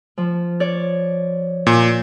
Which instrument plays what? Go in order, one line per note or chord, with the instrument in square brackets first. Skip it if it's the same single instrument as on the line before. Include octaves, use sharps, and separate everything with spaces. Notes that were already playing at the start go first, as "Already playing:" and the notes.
[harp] F3
C#5 D5
[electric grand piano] A#2